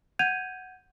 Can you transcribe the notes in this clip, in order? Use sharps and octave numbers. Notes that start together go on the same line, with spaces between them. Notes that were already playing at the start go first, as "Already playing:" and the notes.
F#5 G6 G#6 D#7 F7